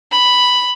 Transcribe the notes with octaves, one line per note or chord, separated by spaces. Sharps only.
B5